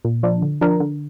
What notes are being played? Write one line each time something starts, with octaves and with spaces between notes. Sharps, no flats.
A#2
F3 D4
D3
F3 D4 A#4
D3